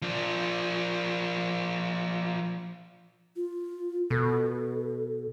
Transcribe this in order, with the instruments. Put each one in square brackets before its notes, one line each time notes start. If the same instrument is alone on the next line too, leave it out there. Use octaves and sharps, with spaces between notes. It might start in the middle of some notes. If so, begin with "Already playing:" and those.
[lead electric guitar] F3 D4
[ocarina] F4
[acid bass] B2 [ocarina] A4